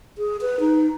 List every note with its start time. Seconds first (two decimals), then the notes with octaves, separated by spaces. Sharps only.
0.18 G#4
0.41 B4
0.60 D#4